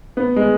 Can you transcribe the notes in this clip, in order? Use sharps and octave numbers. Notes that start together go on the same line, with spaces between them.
B3
G#3